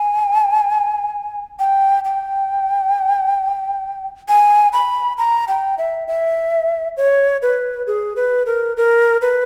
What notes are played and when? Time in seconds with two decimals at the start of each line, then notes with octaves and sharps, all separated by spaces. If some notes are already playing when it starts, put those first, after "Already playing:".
Already playing: G#5
1.59 G5
2.05 G5
4.28 G#5
4.73 B5
5.18 A#5
5.48 G5
5.78 E5
6.08 E5
6.97 C#5
7.42 B4
7.87 G#4
8.16 B4
8.46 A#4
8.77 A#4
9.22 B4